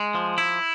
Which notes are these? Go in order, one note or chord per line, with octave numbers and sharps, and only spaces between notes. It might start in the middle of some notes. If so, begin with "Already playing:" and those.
Already playing: G#3
F3
E4